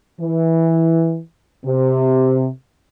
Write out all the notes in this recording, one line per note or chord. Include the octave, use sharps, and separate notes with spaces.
E3
C3